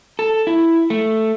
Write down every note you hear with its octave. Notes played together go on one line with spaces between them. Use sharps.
A4
E4
A3